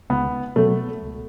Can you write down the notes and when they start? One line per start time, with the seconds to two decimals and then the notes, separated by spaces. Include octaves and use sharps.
0.10 C#2 B3
0.56 B2 F#3 A3 B3
1.03 C#2